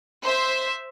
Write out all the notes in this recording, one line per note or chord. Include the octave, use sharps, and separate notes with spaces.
C5 E5